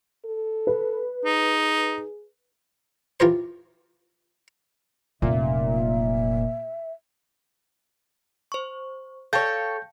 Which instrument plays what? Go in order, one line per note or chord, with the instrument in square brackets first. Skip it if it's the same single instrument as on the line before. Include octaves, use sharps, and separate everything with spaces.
[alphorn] A4
[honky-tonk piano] B4
[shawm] D#4 [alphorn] G#4
[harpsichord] E3 F4 G4 A#4 C5
[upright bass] F1 F#3 [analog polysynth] A#2 [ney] E5
[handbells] C5 C#6
[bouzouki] A4 C#5 [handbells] F5 G5 A5 [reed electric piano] G6